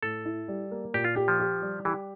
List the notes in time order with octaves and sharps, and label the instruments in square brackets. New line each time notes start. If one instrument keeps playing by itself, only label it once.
[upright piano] A2 [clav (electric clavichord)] A4
[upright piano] E4
G3
A#3
[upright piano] A#2 [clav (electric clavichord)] G4
[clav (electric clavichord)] F4
[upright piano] G4
[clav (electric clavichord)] F3
[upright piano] G4
G3
[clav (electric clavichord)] E3 [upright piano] G4